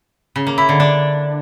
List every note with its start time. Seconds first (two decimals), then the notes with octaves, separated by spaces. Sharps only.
0.36 C#3
0.47 A#3
0.58 E4
0.69 D3
0.80 D4